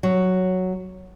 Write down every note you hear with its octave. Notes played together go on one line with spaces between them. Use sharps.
F#3